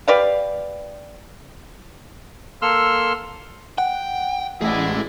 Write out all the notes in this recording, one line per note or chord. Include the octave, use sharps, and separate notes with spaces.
G4 B4 D5 F5
A#3 A4 C6 E6 F6
F#5 G5
A1 E4 G#4 D5 D#5